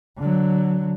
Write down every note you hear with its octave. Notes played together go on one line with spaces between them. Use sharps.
D3 F#3